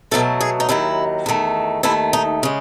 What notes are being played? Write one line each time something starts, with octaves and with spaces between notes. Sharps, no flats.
B2 F#3 A3 A4
G#4
D#4
D#2 D#3 F#3 E4
E2 D#3 A3
D#2 D#3 A3 E4
D#4
C#3 G#3